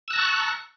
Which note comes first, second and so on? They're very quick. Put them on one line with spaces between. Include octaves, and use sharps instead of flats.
E6 F#6 A#5 A5 C#6